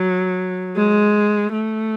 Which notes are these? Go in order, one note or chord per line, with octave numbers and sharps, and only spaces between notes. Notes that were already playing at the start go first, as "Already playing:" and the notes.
Already playing: F#3
G#3
A3